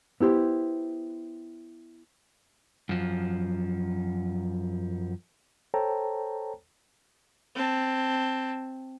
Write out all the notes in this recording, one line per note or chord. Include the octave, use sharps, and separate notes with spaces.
B3 E4 G4 C5
F#2 F3
A4 C5 C#5 G5 A5 A#5
C4 A5